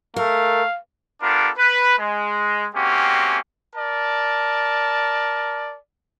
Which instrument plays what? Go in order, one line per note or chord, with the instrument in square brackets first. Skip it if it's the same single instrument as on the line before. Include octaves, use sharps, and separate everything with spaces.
[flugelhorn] A3 [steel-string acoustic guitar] A#4 [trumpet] F5
[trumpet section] B3 D4 F4 G4 A4 A#4
B4
G#3
G#3 A#3 C4 C#4 F#4 G4
A#4 D5 A5